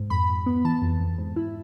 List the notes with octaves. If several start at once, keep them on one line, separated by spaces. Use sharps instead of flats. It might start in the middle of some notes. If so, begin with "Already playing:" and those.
Already playing: G#2
F2 B5
F2
B3
E3 A5
F2
F2
G#2
E4